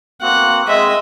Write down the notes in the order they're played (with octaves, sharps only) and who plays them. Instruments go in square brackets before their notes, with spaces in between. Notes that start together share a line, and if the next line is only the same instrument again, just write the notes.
[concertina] A#3 C4 F#4 [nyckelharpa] F#5
[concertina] G#3 C4 [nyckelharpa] D#5 E5